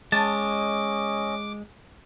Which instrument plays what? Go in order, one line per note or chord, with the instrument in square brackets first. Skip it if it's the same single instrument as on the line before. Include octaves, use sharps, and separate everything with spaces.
[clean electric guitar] G#3 [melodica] C#4 D#5 [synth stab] A5 [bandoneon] D6